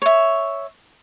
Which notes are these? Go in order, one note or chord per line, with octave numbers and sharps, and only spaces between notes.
C#5 E5